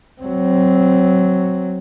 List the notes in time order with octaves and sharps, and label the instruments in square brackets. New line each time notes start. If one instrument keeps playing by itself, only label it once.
[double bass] F#3 C4